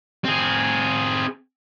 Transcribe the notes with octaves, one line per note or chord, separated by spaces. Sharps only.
C4 G#4